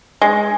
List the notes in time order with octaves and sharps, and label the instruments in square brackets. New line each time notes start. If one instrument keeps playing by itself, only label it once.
[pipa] G#3